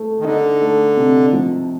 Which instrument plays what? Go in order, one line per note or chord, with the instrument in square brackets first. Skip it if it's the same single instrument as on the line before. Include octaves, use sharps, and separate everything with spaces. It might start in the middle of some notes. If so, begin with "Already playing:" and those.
Already playing: [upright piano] A3
[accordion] D#3
[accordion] D3 [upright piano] D#4
[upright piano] A3
C3
F3